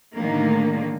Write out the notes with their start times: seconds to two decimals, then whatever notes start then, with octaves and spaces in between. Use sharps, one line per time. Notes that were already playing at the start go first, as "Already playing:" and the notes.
0.15 A2 D3 D#3 F#3 G#3 A#3